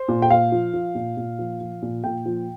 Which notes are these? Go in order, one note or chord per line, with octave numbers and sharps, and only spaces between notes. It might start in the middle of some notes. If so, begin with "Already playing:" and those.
Already playing: C5
A#2
G5
A#2 F5
F3
F3
A#2
A#2
F3
F3
A#2
A#2 G5
F3